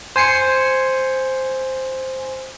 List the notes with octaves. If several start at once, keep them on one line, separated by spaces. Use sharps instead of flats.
C5 G#5 C7 C#7